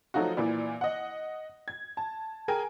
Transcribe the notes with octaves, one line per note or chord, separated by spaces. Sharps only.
F3 F#3 A3 D#4 F4 F#4
A#2 E3 E4 D5
D#5 F#5
G#6
A5
G#4 A#4 G5 G#5